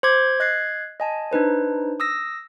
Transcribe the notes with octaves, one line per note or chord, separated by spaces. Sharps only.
C5 C6 D6 G#6
D#5 F#6 G#6 A6 C7
D#5 G#5 A5
D4 D#4 B4 C5
D#6 E6 A#6